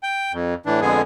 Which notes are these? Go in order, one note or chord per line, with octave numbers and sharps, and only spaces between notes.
G5
F2
A2 E3 D4
F2 D3 G#3 B3 G#4